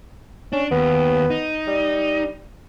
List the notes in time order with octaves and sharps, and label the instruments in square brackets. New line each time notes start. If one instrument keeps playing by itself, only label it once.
[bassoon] C#4 [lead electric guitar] D4
[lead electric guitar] D#2 [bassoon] B3
[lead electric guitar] D#4
[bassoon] G3